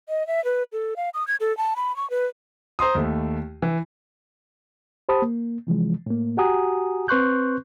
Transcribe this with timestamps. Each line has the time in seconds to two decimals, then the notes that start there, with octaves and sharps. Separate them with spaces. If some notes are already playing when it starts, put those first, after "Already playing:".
0.09 D#5
0.27 E5
0.45 B4
0.73 A4
0.96 F5
1.14 D#6
1.28 G#6
1.40 A4
1.57 A5
1.76 B5
1.96 C#6
2.10 B4
2.79 C5 A#5 C6 D#6
2.95 D#2 A3
3.62 E3
5.09 G4 C5 A5 B5 D#6
5.22 A#3
5.67 C3 E3 F3 G#3
6.06 A2 A#3
6.37 F#4 G4 F#5 G#5 A#5 D#6
7.08 C4 B4 C6 C#6 F#6 G6